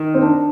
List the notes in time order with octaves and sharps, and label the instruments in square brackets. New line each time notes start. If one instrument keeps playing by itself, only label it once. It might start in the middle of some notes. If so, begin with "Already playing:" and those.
Already playing: [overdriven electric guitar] D#3
[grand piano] C4
D4